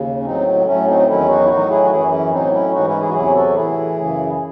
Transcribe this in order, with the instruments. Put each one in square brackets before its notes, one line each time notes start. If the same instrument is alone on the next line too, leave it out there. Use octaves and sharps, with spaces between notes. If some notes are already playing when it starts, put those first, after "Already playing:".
Already playing: [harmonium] D#2 C#3
C#4
A2 F#3 C4 D#4
A2 F#3 A3 C#4
C4 D#4
E2 D#3 F#3 C#4 E4
D#4 F#4
E4
A2 F#3 D#4 F#4
E4 G#4
F#4
F#2 E3 E4 G#4
C#4 E4
A2 F#3 C4 D#4
C#4 E4
G#2 E3 D#4 F#4
C#4 E4
E4 G#4
F#4
E2 C3 F#3 E4 G#4
F#4 A4
A2 E3 E4 G#4
F#2 C#3 E3